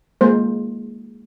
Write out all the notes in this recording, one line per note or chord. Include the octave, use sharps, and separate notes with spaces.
G#3 A#3 C5